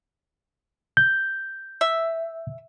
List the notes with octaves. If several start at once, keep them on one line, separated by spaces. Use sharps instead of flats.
G6
E5